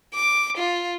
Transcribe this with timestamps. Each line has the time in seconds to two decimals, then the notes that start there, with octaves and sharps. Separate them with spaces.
0.15 D6
0.58 F4